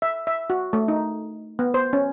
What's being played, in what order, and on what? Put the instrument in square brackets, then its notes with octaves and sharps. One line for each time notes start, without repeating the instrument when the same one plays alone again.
[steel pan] E5
E5
F#4
A3
D#4
B3
C5
C#4